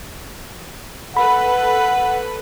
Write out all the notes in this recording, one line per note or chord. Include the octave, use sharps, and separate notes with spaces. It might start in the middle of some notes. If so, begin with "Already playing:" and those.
A4 B4 F#5 B5